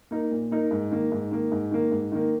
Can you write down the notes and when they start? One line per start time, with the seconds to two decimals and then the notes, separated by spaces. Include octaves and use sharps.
0.11 A#3 D#4 A#4
0.31 A#2
0.51 A#3 D#4 A#4
0.71 G#2
0.91 D#3 A#3
1.12 G#2
1.31 D#3 A#3
1.52 G#2
1.71 D#3 A#3
1.91 G#2
2.12 D#3 A#3